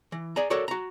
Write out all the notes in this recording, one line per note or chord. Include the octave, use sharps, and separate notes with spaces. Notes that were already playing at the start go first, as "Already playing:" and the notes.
E3
G#4 D5 G#5 A#5
F#4 A4 A#4 C#5 D5
F#4 A#5